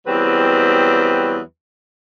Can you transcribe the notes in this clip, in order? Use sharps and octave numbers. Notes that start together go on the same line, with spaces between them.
E2 F#3 G3 C4 B4